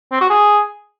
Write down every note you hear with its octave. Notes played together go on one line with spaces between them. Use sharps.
C4
F#4
G#4